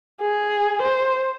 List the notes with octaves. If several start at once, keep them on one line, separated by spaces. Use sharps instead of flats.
G#4
C5